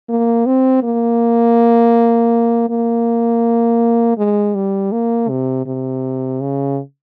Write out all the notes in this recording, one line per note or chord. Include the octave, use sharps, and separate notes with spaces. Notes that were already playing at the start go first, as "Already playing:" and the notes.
A#3
C4
A#3
A#3
G#3
G3
A#3
C3
C3
C#3